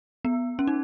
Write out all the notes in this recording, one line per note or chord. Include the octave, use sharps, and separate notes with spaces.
B3
C#4
D#4